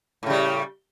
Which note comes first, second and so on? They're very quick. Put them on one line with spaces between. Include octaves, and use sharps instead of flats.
A2 C#3 G3